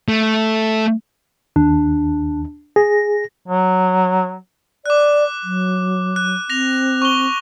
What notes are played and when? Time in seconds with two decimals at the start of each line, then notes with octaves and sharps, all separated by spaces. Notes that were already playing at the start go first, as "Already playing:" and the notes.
0.08 A3
1.56 D#2 D4
2.76 G#4 A#6
3.48 F#3
4.86 D5 D6 F#6
5.44 F#3
6.16 F#6
6.50 C4 A#6 F7
7.02 C#6 G7